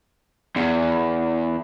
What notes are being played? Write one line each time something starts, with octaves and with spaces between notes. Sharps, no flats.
E2